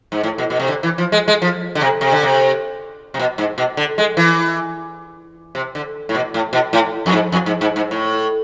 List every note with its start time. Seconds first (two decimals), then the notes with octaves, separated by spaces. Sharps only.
0.12 G#2
0.23 A2
0.38 B2
0.50 B2
0.60 C3
0.68 D3
0.83 E3
0.98 F3
1.12 G#3
1.28 G#3
1.42 F3
1.75 D3
1.81 C3
2.01 C3
2.12 D3
2.23 C3
3.14 C3
3.19 B2
3.38 G#2
3.58 B2
3.77 D3
3.98 G#3
4.17 E3
5.55 C3
5.75 D3
6.09 A2
6.15 B2
6.34 A2
6.53 B2
6.73 A2
7.06 F2
7.13 G#2
7.32 F2
7.46 G#2
7.61 G#2
7.76 G#2
7.91 A2